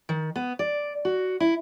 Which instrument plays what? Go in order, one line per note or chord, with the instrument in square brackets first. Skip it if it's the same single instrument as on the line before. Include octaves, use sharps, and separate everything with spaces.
[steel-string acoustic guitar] D#3
B3
D5
F#4
E4